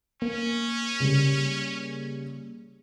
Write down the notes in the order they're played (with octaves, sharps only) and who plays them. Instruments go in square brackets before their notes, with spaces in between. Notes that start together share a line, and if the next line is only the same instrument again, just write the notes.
[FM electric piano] A#3 [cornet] C#4
[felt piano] C#3 G3